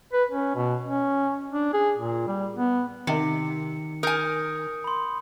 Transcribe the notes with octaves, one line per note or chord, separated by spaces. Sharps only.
B4
C#4
B2
C#4
D4
G#4
A#2
G3
B3
C3 D#3 C#7
A#4 G#5 D#6 G6 C#7
B5 C6